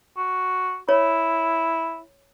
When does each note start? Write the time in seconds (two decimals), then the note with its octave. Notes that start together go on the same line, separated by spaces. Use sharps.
0.17 F#4
0.89 E4 C#5